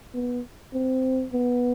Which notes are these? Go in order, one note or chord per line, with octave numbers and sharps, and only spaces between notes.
B3
C4
B3